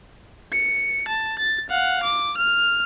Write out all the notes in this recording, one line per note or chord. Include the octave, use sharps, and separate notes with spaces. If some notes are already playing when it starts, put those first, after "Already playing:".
C#7
A5
A6
F5 F#5
D6
F6